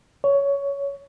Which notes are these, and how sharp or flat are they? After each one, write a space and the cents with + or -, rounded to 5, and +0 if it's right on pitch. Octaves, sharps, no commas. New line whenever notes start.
C#5 +15